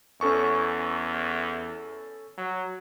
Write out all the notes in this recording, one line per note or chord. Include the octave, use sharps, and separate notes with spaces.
E2 C#4 A4 C#6
F#3